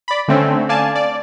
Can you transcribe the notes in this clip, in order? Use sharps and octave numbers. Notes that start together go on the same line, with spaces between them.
D5 B5
D3 A3 C4 C#4
D5 F5 G#5 A5
D5